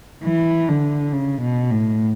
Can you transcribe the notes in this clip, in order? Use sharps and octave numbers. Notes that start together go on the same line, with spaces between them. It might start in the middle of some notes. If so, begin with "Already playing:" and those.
E3
D3
C#3
B2
A2